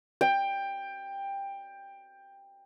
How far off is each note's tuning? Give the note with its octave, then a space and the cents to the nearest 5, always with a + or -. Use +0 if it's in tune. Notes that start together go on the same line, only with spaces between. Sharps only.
G5 +15